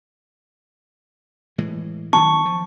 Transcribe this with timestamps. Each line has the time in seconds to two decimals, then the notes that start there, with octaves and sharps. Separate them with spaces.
1.58 A2 E3 G#3
2.13 D#3 F#3 B3 A5 C#6
2.45 F3